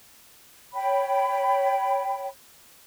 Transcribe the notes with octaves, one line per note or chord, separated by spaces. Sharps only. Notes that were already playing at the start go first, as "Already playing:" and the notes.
C#5 G5 B5